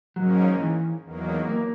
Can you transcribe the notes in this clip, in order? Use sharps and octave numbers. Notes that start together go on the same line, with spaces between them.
G#2 D#3 F#3 A#3 C#4
E3
E2 D#3 F#3 A#3
A#3